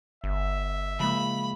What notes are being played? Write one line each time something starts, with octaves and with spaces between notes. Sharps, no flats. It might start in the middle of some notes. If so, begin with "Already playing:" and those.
G1 E5
C#3 F3 G#3 A#3 B5